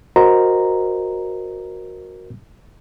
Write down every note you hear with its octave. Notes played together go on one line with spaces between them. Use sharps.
F#4 A#4 C5 D#5 A#5